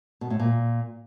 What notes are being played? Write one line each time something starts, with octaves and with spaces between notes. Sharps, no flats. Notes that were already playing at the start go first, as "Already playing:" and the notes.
B2
A2
A#2